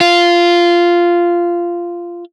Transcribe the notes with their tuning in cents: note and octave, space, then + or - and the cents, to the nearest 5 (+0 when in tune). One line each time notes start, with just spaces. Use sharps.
F4 -10